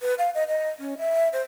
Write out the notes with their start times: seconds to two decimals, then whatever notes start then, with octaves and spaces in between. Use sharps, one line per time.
0.01 B4
0.18 F5
0.35 D#5
0.48 D#5
0.79 C#4
0.98 E5
1.33 C5